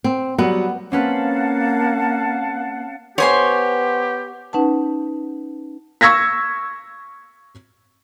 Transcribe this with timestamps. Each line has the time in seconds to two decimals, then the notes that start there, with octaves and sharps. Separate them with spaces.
0.04 C4
0.38 F#3 G3 B3 F#5
0.92 A#3 C4 C#4 B4 F5 F#5 A5
3.18 B3 G4 C5 C#5 G#5 C6
4.53 C#4 D#4 B4 F#5 A5
6.01 C#6 E6 G#6 A#6 B6